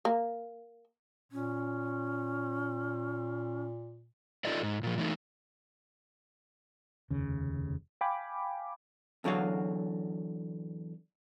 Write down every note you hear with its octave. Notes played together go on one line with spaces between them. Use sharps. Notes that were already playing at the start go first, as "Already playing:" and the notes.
A#3
A#2 C#4
D#4 F4 A4 D5 D#5
G#2
A#2 F3
E3 A3 D#4
F1 D#2 C#3
F5 G5 G#5 B5 D6
E2 D3 F#3 F#4 F5